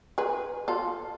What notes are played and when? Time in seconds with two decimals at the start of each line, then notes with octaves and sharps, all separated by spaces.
0.18 G#4 B4
0.68 F4 A4